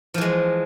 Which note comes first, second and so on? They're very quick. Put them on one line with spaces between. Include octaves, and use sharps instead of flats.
F3 E3 G#3